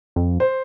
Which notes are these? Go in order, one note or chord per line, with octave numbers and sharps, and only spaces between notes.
F2
C5